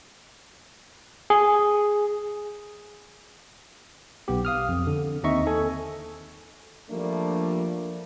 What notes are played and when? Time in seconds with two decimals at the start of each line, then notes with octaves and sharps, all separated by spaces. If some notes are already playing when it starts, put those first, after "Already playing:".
1.30 G#4
4.28 B1 B3 G4
4.45 F5 D#6 F6
4.69 F2
4.87 D3
5.23 D#2 C4 D#4 D#5 E5 C#6
5.47 A4 G#5
6.90 F3 G3 A3 A#3 D4